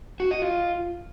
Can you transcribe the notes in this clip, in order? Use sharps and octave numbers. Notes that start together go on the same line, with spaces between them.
F#4
D#5
F4